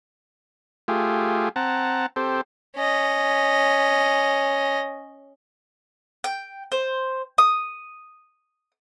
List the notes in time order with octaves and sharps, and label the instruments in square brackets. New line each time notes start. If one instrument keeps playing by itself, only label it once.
[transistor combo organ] A3 F4 G4 G#4
C4 F#5 A5 A#5
C4 G4 A4 C5
[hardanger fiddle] C#4 D#5
[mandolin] G5
C5
D#6